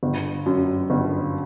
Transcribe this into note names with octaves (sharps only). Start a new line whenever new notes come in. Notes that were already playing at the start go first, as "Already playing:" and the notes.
G1
F#2
G1